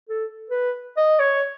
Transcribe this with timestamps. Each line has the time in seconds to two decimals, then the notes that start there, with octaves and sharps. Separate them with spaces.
0.09 A4
0.50 B4
0.97 D#5
1.19 C#5